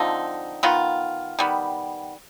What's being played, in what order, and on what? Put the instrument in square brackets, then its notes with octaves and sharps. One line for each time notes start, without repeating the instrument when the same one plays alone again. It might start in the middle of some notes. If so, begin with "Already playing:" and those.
Already playing: [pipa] D3 F3 C4 D#4
D#3 B3 F4
D#3 G3 B3